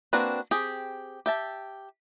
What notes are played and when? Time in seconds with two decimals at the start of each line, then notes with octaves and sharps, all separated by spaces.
0.13 A#3 C4 D4 F#4 B4
0.51 C4 G4 G#4
1.26 G4 E5 A5